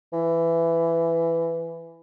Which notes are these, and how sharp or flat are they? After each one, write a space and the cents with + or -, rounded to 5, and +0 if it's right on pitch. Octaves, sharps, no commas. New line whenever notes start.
E3 +15